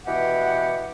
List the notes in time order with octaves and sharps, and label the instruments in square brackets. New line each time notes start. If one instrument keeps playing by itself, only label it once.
[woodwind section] B2 E3 G4 F#5